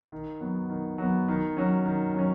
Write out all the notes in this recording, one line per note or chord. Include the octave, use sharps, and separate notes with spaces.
D#3
F#3 B3
D#3
F#3 B3
D#3
F#3 C#4
D#3
F#3 C#4